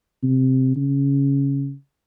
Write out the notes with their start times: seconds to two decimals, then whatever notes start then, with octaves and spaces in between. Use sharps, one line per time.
0.23 C3
0.76 C#3